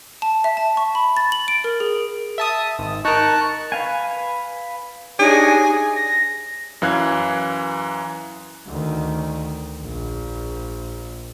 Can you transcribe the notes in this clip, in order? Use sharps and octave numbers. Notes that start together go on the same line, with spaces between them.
A5
E5
A5
C#6
B5
A6
F#7
D7
A#4
G#4
E5 A5 D#6
G#1
D#4 A#4 A5 C#6 F#6
B4 F5 G#5
D4 D#4 G4 G#4 C#5
A#6
F#2 E3 F5 F#6 G#6
D2 D#3
A#1